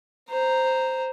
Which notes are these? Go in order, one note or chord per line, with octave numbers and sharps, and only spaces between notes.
C5 A#5